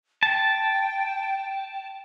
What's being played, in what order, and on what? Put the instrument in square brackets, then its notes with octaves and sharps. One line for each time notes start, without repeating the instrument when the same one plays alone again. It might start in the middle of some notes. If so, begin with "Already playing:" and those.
[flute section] G5 [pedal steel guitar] A5